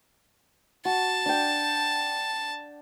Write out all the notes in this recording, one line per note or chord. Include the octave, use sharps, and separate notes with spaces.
F#4 A5
D4 G5